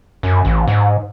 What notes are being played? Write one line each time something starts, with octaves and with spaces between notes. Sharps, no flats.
F#2
A1
G#2